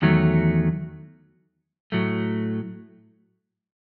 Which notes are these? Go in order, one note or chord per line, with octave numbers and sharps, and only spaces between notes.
E2 D#3 F#3 A3
A2 F#3 A3